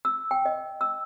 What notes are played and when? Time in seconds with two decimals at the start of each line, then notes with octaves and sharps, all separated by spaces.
0.05 E6
0.31 G5
0.45 D#5
0.81 E6